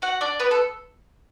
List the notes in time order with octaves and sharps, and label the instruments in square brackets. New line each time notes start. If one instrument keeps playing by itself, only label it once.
[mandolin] F#4 F#5
D4 D5
B3 B4
A4